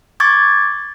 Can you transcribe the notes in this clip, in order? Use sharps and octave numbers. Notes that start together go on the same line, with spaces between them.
C#6 D6 G#6 A6